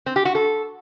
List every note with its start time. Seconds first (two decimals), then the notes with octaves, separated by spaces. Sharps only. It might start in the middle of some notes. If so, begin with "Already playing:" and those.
0.06 C4
0.16 G4
0.25 F#4
0.35 A4